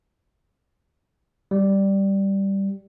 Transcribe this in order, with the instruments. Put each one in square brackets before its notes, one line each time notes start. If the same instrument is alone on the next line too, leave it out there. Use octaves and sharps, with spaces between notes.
[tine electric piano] G3